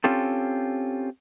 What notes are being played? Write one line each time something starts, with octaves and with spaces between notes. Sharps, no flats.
C4 C#4 F4 G4 A4